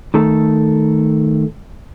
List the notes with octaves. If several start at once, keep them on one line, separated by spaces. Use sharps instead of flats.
D#3 A3 A4